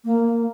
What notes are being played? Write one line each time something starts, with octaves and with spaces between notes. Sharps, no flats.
A#3